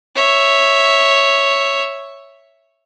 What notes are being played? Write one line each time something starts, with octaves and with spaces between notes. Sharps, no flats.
C#5 E5